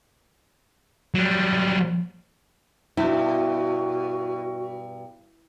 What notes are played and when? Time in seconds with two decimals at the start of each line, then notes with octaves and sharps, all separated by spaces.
1.14 F#3 G3
2.97 G2 B2 E4 F#4